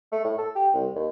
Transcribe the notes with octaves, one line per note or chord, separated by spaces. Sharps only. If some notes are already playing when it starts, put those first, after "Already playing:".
A3
A2
A4
G4
C2
D#2